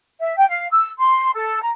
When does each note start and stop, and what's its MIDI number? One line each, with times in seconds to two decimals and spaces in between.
0.20 0.34 76
0.37 0.45 79
0.49 0.67 77
0.71 0.88 88
0.98 1.30 84
1.34 1.61 69
1.62 1.69 82